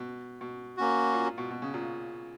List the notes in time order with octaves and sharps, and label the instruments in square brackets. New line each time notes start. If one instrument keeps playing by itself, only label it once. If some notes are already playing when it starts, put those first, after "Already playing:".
Already playing: [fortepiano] B2
B2
[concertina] A#3 C#4 F#4
[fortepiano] A#2
A#2
B2
B2
C#3
A#2